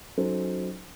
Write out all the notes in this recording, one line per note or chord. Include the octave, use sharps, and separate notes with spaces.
F#3 C#4 D#4 A4 C5